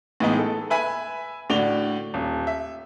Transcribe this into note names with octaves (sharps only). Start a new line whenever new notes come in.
A2 E3 G#3 B3 D#4
A4
B4 E5 G#5 B5
A2 D3 F#4 D5 F7 G7
D#1
E5